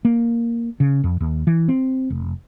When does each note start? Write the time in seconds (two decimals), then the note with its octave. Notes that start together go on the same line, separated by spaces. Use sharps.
0.05 A#3
0.80 C#3
1.04 F2
1.20 D#2
1.47 E3
1.68 C4
2.10 F1